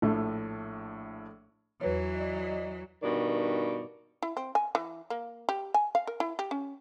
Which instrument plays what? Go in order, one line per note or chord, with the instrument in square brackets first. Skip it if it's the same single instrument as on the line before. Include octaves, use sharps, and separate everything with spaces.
[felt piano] A#1 A2 A3
[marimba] E2 B4 C#5 [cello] E3 F#3
[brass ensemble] D5 D#5
[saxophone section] G2 B2 D#3 D5
[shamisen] E4
C4
G#5
E3
A#3
G4
G#5
F5
A#4
E4
G4
C#4